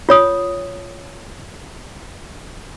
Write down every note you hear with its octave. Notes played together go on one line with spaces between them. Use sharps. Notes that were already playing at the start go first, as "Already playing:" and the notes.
F4 C#5 D#6